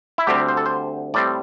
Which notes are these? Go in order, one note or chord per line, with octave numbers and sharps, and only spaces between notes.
E4
D2 D3 G3 C4 G4
C5
A4
C5
A2 G3 C4 D5